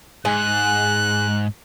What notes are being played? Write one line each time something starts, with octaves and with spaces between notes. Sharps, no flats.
G#2 G#3 G#5 F#6